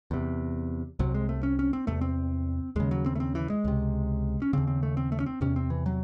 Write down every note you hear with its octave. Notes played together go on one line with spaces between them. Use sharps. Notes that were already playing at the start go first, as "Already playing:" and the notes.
E2 C3
C2 C3 F#3
G#3
A3
C#4
C#4
C4
E2 C3 A3
C4
D#2 C#3 G#3
F#3
C4
A3
C4
E3
G#3
C#2 C3
C#4
D#2 C#3 C4
C4
A3
C4
A3
C#4
C4
E2 C3 C#4
C4
E3
F#3